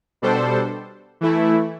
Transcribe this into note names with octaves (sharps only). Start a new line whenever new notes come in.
B2 G3 D4 A4 C5
E3 A3 E4